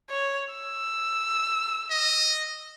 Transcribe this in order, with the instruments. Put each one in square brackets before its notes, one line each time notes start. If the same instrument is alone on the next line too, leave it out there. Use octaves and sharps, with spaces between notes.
[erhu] C#5
E6
[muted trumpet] D#5